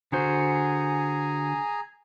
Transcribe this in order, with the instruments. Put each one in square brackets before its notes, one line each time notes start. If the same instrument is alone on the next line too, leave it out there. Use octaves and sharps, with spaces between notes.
[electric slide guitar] D3 F#4 C5 [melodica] G#4 G#5 A#5